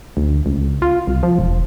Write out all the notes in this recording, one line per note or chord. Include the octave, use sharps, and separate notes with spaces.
D2
C#2
F4
C2
F3
E1